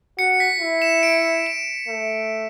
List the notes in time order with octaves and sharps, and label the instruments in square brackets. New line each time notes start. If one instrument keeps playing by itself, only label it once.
[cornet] F#4 [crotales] C#7
[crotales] B6
[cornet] E4
[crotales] E7
D7
E7
[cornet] A3